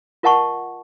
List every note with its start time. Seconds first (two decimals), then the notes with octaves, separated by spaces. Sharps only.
0.23 F4 A#4 D#5 F#5 A5 C#6